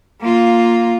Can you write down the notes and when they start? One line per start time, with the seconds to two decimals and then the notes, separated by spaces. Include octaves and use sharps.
0.21 A#3 F4